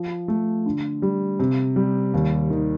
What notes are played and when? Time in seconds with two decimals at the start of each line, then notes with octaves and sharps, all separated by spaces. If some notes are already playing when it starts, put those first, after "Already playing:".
Already playing: F3
0.28 A3
0.66 D3
1.02 G3
1.39 C3
1.76 G3
2.14 D#2
2.50 D#3